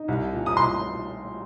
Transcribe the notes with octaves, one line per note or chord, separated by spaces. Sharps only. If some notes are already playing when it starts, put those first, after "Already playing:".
Already playing: D#4
C2
A#2
D#6
C2 C6